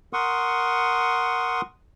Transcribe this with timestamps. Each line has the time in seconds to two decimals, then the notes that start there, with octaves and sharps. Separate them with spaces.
0.13 A#4 F#5 C6 C#6 D#6